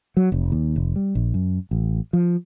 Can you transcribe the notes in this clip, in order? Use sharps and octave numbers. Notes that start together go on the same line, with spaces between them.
F#3
F1
D#2
F1
G3
A#1
F#2
A1
F3